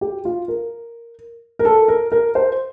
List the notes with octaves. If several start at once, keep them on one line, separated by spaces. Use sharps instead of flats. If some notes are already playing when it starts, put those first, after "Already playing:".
G4
F4
A#4
A#4
A4
A#4
A#4
C5